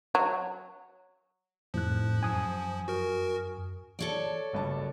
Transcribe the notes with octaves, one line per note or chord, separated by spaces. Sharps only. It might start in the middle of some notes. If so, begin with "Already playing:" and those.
F#3
F2 A2 F3 F#6
F#2 G#5 D#6
F#4 A#4
A4 C#5 D5
F#1 G2 A5